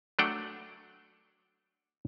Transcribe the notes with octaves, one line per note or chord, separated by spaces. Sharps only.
F#3 A3 D4 F#5 G5